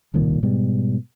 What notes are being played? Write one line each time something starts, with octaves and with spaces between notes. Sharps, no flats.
D1 C2 A#2 D#3
G#2 B2 G3